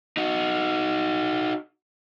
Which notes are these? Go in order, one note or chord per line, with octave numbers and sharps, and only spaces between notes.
D#4 F#4